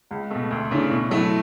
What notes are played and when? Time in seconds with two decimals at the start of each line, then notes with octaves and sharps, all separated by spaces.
0.11 C#2
0.31 B2 A3
0.51 D2
0.71 C#3 E3 A3 D4
0.91 B2
1.10 F#3 A3 E4